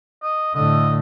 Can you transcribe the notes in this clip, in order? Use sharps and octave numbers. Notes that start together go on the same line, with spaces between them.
D#5
A2 D3 D#5